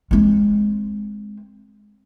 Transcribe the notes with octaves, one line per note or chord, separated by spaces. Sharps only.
G#3 C4